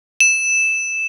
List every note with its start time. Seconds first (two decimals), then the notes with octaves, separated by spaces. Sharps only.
0.20 E7